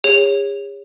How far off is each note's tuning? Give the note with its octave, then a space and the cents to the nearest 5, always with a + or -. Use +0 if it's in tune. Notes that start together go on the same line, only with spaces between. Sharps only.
G#4 -45 C#5 -5